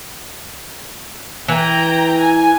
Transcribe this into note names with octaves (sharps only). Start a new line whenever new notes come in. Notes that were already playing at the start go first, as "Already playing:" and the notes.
E3 G5 A#5
G#5